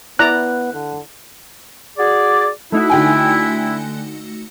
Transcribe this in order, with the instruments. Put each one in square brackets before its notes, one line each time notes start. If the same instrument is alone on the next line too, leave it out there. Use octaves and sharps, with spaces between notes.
[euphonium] B3 [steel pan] E4 D5 A#5 [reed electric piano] F#6
[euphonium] D3
[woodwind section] F#4 G#4 D5
[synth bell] A3 D#4 F#4 [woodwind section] E4
[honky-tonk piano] D3 G5 G#5